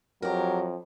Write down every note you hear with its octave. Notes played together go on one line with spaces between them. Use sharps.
F2 F#3 G4 A#4